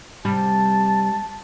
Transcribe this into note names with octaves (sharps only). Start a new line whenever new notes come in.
C3 G3 A5